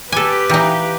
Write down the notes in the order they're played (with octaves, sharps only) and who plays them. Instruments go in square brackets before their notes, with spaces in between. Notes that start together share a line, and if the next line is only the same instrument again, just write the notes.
[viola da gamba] G4 B4 [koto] A4 G#5 [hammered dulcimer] D6
[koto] E3 D#4 [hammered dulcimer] F5 G5 A#5